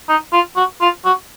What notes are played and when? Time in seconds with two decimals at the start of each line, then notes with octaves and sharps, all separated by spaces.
0.09 D#4
0.33 F4
0.56 F#4
0.81 F4
1.05 F#4